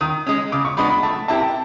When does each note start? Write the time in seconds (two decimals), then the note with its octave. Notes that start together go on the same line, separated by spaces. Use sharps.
0.01 D#3 D#6
0.26 G#3 C#4
0.52 C#3 D6
0.65 C#6
0.77 F3 G#3 B3 D4 B5
0.90 B5
1.03 A3 A5
1.28 C4 E4 G4 A#4 A5
1.41 A5